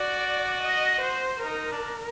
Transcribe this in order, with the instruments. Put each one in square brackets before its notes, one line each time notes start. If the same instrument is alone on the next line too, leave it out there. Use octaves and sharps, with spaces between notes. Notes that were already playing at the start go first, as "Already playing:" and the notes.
Already playing: [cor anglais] F#4 [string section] D5
[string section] D#5
C5
[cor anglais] D#4 [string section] A#4
[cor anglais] D4